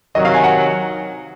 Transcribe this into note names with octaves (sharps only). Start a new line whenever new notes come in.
C3 D#3 F#3 D#5
F5
G#5
F#5